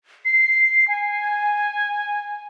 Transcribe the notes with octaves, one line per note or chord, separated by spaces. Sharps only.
C7
G#5